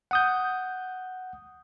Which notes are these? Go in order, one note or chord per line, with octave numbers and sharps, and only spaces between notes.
F#5 D#6 G6